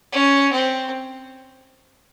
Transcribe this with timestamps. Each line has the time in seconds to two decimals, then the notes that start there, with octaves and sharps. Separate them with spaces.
0.12 C#4
0.53 C4